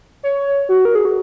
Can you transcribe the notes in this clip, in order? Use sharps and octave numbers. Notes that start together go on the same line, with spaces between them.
C#5
F#4
A#4
G#4
F#4